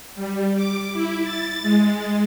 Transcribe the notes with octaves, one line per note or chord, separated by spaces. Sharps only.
G3
D6
E4
A6
G#3